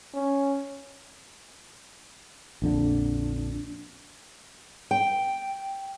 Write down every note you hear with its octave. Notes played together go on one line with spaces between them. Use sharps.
C#4
A#1 F2 D3 D4
G5